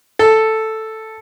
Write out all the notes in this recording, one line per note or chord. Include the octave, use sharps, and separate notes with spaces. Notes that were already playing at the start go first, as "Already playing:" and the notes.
A4